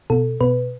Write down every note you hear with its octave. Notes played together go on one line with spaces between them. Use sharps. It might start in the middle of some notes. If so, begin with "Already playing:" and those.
B2 A4
B2 B4